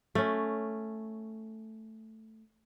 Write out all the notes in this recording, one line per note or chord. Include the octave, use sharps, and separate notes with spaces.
A3 C#4